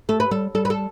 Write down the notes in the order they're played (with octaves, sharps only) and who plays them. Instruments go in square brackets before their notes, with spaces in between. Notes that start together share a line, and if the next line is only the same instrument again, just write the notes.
[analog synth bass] A3 [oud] A4
[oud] B4
[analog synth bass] G3 [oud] A4
[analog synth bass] G3 [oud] A4
[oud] B4
A4